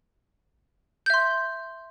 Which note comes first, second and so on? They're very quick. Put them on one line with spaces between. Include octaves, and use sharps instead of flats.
G6 E5 C6